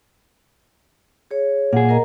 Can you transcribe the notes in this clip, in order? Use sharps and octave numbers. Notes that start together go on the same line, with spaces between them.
G#4 C#5
A#2 G#4 F#5
A#4 D#5 A#5